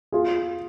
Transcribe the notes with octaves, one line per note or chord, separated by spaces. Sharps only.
F4 G#4